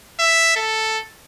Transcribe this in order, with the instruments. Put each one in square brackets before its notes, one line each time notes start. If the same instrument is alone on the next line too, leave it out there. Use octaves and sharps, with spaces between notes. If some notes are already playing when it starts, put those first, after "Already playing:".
[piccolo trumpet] E5
A4